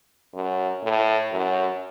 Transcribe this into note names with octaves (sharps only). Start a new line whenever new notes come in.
F#2
A2
F#2